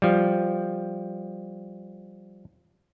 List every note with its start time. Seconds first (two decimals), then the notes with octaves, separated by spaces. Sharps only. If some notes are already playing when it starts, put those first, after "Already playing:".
0.02 F3 G3